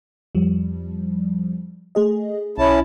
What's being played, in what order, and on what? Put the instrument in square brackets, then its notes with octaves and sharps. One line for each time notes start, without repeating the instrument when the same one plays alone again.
[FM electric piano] F2 F3 G3
A3 G#4 D#5
[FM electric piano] B1 [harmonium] C#4 E4 A5